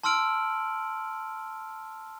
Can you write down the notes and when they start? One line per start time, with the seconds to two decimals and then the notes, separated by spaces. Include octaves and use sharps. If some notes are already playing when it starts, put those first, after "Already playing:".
0.04 A5 C6 E6 F6 D7 F#7